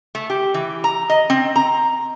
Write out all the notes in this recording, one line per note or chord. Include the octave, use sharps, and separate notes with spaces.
A3
G4
E3
A#5
D#5
C4
A#5